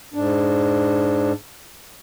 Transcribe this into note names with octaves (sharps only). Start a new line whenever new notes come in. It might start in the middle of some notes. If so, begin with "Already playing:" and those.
G#2 D4